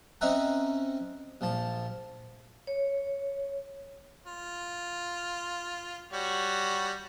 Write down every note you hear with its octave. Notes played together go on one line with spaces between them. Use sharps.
C4 C#4 D#4 E5 F#5 A#5
A#1 F3 A5
C#5
F4
G3 F#4 C#5